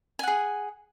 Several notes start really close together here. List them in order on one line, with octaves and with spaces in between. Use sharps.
G#5 F#5 G#4